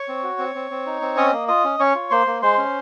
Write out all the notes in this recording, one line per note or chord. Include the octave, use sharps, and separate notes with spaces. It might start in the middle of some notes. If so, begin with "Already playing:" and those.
Already playing: C#5 C#6
C4
F#4
C4
C4
C4
D#4
C4
C#4 D#5 D#6
A#3
F4 D#5 D#6
C#4
C#4 C#5 C#6
F4
A#3 C5 C6
A#3
G#3 C5 C6
C#4